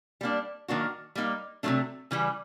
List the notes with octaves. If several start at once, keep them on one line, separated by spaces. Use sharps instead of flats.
G3 A#3 D4
D#3 F#3 A#3 D4 F#4
G3 A#3 D#4
C3 D#3 F#3 A3 D4
C#3 E3 G3